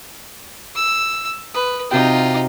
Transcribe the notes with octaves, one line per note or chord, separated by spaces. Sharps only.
E6
B4 D#6
C3 D#4 F4 F#4 G5